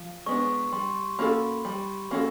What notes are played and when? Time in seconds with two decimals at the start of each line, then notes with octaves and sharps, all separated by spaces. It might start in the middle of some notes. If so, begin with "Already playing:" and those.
Already playing: F3
0.26 G#3 B3 D4 C#6
0.72 G3 C6
1.19 A#3 C#4 F#4 A4 B5
1.65 G3
2.11 A#3 C#4 F#4 A4